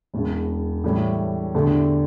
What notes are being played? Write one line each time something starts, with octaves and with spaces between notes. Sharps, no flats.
E1 E2 C#3
A2 E3 G3 C#4 E4
E2 D3 A3 D4 G4